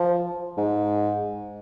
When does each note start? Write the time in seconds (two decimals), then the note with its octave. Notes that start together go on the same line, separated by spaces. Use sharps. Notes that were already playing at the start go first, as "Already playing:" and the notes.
Already playing: F3
0.57 G#2